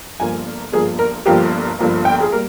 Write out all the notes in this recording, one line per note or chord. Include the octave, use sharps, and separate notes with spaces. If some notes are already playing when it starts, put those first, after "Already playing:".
G1 G2 F3 A#3 G#5
G1 G2 F3 A#3 G#4
A#4
G1 G2 F3 A#3 G4
G1 G2 F3 A#3
G5
G#4
G3 A#3 A#4